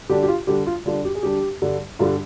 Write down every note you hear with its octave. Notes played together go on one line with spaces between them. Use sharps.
D3 G3 D4 G4
G4
F4
D3 G3 D4 G4
F4
D3 G3 D4 F4
G4
G#4
D3 G3 D4 G4
G2 D3 G3
G2 D3 G3 F4